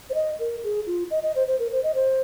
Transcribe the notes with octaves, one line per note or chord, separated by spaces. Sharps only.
C5
D#5
A#4
G#4
F4
D#5
D#5
C5
C5
A#4
C5
D#5
C5